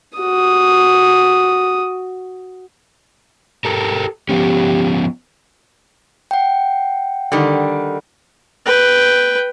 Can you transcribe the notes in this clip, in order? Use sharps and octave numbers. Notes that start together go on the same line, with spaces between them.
F#4 D#6
G4 A4 A#4
F3 B3 C#4 G4
F#5 G5
D3 D#3 G3
B4 G5